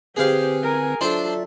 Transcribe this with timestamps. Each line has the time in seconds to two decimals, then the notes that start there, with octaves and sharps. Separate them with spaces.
0.16 D3 C4 G4 G#4 B4 C5 F5
0.63 A#4 G#5
1.01 F#3 D4 F4 A4 C5 D5 E5